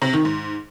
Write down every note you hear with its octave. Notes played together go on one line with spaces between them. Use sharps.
C3
D#3
G#2